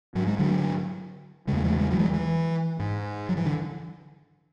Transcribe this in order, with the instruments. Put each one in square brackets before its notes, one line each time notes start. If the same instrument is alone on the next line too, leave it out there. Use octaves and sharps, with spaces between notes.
[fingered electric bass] G#2 F#3
G#3
D3 F#3
C#3 G#3
E2 A3
E3 G#3
G#3
F#3
E3 G#3
E3
G#2
F#3
E3
D3